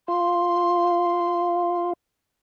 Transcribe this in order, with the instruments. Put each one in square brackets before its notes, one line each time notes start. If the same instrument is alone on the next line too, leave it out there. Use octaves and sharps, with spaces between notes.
[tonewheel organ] F4 [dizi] C6